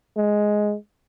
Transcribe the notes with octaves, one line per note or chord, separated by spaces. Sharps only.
G#3